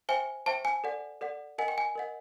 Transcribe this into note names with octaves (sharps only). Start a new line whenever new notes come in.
C5 E5 G5 G#5
C5 E5 G5 A5
G#5
A4 D5 F#5
A4 D5 F#5
A#4 D#5 F#5 G#5
G5
G#5
A#4 D#5 F#5